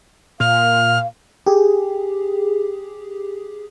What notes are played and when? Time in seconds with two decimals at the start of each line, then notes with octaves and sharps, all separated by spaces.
0.40 A#2 F5 F6
1.46 G4 G#4